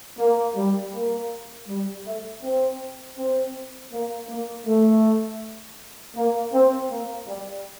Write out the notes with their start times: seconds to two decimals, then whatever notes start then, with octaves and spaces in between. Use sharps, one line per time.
0.18 A#3
0.55 G3
0.94 A#3
1.68 G3
2.06 A3
2.42 C4
3.18 C4
3.92 A#3
4.29 A#3
4.67 A3
6.16 A#3
6.53 C4
6.90 A#3
7.27 G3